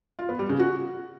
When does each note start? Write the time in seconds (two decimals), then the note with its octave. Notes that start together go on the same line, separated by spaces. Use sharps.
0.19 F4
0.29 B3
0.39 G3
0.49 C#3
0.60 F#4